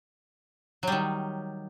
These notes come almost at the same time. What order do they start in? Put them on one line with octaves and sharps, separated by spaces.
F#3 G3 D#3